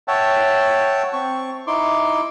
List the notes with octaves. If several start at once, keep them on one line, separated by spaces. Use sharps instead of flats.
C#5 E5 F#5 G5 A5
C4 C#6
D#4 E4 C6 D6